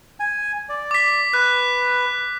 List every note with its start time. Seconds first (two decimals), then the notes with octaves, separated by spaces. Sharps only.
0.20 G#5
0.69 D5
0.91 D6 B6
1.34 B4 F#6